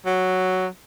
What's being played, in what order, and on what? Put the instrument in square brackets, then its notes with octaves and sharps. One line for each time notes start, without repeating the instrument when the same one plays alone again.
[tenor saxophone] F#3